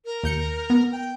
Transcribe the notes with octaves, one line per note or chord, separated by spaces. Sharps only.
A#4
D#2 G6 C#7
B3
G5